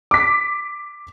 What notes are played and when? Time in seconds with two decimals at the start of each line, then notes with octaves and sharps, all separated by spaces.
0.11 D6 B6